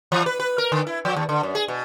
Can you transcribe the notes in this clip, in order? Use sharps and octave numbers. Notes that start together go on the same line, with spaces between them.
E3
B4
B4
A#4
D3
E4
F3
D#2
D3
F#2
G#4
B2